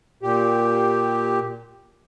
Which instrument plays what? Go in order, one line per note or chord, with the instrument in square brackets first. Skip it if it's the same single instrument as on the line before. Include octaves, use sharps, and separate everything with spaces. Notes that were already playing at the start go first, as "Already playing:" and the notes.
[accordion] A#2 G4